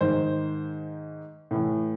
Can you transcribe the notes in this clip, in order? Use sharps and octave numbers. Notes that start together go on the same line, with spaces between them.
G#2 D#3 C5
A2 E3